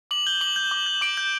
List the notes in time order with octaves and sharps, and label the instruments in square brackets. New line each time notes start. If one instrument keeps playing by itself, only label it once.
[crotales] D6 F#7
G6 G7
D6 F#7
G6
D6
G6
D6 D7
G6